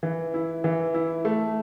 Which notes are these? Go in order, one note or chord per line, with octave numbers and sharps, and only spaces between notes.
E3
E4
E3
E4
A3